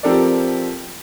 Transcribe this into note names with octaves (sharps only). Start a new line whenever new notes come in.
F3 C4 G4 A4 A#4 D5